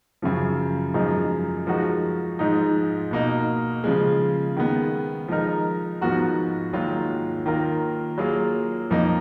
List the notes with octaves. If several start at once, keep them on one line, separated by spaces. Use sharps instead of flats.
F#2 C#3 F3
F#2 F3 G#3 D#4
F3 G#3 D#4 F#4 A#4
G#2 F3 G#3 D#4
B2 A#3 D#4
C#3 F3 G#3
D#3 G#3 B3
F3 G#3 D#4 A#4
G#2 F3 B3 F#4 A#4
G#2 D#3 F#3 A#3 F4
D#3 A#3 F4 A#4
F#3 A#3 F4 G#4
F2 F3 A#3 D#4